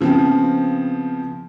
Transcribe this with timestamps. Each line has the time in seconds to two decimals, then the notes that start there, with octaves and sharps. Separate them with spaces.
0.01 C#3 F3 B3 C4